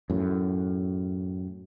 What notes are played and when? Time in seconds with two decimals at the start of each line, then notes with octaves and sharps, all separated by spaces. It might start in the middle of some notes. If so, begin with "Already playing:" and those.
0.10 F#2 A2